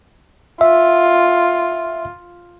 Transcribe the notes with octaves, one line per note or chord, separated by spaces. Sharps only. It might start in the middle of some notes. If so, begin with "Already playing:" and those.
F4 E5